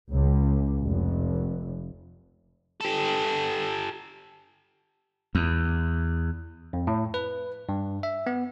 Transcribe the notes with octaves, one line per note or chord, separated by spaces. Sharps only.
C#2
F1
G4 A4
E2
F2
A2
B4
G2
E5
B3